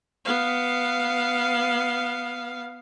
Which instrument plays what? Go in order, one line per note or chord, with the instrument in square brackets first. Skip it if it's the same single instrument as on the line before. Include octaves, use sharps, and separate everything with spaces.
[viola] B3 F5